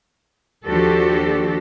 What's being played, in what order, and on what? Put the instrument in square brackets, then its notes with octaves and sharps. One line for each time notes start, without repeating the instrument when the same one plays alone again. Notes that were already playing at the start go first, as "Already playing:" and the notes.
[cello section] D#2 F3 D4 F#4 G4 A4